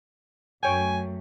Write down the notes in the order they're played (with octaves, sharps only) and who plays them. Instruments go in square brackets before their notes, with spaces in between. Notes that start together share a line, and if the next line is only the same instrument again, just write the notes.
[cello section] F#2 A3 [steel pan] C#5 G5 [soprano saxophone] G#5